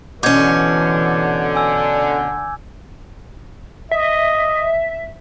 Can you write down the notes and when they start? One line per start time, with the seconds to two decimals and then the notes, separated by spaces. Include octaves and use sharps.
0.23 B2 D3 E3 C#4 D6 G6 G#6
1.56 G#5 E6
3.91 D#5 E5